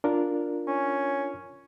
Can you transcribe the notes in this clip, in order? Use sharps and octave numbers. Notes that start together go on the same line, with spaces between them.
D4 F4 A#4
C#4